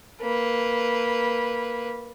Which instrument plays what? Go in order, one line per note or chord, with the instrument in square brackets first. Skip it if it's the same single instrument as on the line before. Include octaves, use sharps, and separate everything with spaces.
[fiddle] A#3 B4